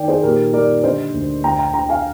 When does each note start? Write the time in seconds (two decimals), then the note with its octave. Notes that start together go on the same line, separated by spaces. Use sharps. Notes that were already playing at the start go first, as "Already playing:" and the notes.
Already playing: D#3 D5 G5
0.08 G#4 C5
0.23 A#2 G4 A#4
0.53 G3 A#4 D5
0.83 D3 C5 D#5
1.14 D2
1.43 D2 G5 A#5
1.59 G5 A#5
1.74 D3 G5 A#5
1.89 F5 G#5